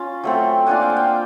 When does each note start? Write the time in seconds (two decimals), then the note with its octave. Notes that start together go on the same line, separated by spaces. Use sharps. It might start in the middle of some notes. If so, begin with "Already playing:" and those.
Already playing: C#4 F4
0.24 F#3 A3 C4
0.67 A#3 D4 F4 F#5 G#5
0.82 F5 G5
0.90 F#5
0.96 F5 G5